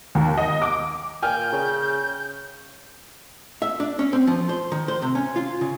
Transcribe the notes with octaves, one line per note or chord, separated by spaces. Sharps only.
D#2
D#5
D6
A#2 G5 G#5 F6 G6
C#3
E5
D4
C#4
C4
F3
C5
D#3
C5
C3
C#4
F4
C#3